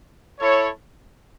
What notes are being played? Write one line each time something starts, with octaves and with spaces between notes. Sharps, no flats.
E4 A4 C#5